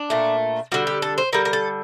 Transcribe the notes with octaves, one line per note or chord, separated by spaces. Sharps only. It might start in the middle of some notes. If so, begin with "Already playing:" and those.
Already playing: D4
A#2 A3
D3 G3 F#4
G4
A4
C5
D3 G3 A#4
A#4
A4